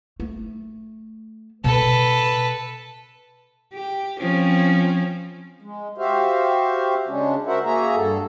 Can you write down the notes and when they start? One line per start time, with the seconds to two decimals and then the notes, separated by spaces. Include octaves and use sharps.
0.20 A3
1.64 B2 A4 B4
3.74 G4
4.20 F3 C4 C#4
5.60 G#3
5.98 F#4 G4 C5 E5 F5
7.08 C#3 G#3 C#4 D4
7.47 F#4 A#4 C5 E5 F#5
7.64 A#3 F#4 G#4 E5 A#5
7.95 G2 A4